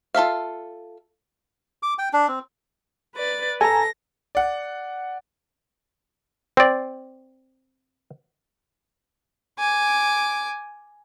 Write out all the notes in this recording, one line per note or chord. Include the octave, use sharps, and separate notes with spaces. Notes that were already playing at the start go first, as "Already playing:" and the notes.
F4 A4 E5 F5
D6
G5
D4
C4
B4 D5 A6
A4 G#5 A#5 A#6
D5 F#5
C4 D5
G#5 D6